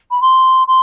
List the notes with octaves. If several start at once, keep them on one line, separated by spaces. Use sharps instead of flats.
B5
C6
C6